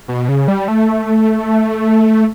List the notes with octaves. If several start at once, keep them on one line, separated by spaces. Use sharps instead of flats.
B2
C#3
G3
A3